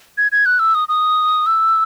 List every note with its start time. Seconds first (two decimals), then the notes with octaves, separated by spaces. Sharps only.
0.18 G#6
0.32 G#6
0.46 F#6
0.59 E6
0.75 D#6
0.89 D#6
1.46 E6